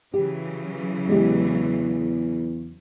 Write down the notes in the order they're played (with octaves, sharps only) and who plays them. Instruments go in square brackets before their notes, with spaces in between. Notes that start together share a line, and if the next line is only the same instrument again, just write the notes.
[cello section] C#3 E3 F#3 [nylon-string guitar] G4
[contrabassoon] E2 [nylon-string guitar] G#3 G4